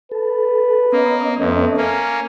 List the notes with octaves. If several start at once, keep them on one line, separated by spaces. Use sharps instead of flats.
A4 B4
A#3 B3 C#4 D#5
F2 A3
A#3 C#4